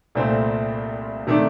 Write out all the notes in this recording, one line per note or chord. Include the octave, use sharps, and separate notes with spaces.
C2 A#2 A3 C4
C3 D#3 A3 D4